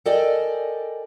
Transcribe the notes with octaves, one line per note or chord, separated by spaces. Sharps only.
A4 A#4 D5 D#5 G5 G#5